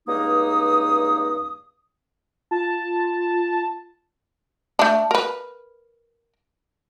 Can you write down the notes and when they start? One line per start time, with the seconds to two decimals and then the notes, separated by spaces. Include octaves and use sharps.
0.07 C#2 G2 A#3 D#4 D#6
2.51 F4 A5
4.79 A3 D4
5.11 A#4 B4